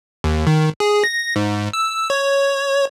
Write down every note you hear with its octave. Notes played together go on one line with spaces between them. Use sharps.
D#2
D#3
G#4
A#6
G#2
E6
C#5